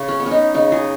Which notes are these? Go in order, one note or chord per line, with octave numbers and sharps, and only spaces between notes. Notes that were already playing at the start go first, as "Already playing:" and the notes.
Already playing: C#3
C#4
B3
C#4
D#4
C#3 D#4
G#4